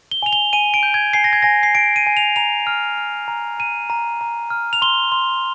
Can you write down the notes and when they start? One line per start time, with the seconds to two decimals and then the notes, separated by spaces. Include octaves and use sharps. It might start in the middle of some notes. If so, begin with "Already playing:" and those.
0.11 G7
0.23 G#5 F7
0.33 G7
0.53 G#5 D#7
0.74 D7
0.83 G6
0.94 G#6
1.13 G#5 C7
1.24 A#6
1.33 G#6
1.42 G#5 A#6
1.63 C7
1.75 G#5 D7
1.96 D#7
2.07 G#5
2.17 F7
2.36 A#5 F7
2.67 F6
2.98 F6
3.28 A#5
3.59 A#5 D#7
3.90 A#5
4.21 A#5
4.50 F6
4.73 F7
4.82 C6 G7
5.12 C6